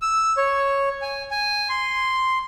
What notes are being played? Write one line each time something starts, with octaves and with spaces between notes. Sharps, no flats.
E6
C#5
G#5
G#5
C6